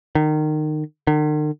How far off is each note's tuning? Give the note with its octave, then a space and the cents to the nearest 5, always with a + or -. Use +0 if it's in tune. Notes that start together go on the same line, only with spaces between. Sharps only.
D#3 -25
D#3 -45